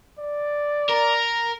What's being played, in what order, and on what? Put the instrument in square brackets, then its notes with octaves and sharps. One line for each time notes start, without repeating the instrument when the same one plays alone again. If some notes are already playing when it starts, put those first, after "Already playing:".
[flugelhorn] D5
[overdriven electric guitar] A#4